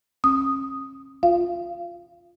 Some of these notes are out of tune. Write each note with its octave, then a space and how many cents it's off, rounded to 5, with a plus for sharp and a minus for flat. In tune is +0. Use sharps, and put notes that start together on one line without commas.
C#4 -40 D#6 +0
F4 +0 F5 -25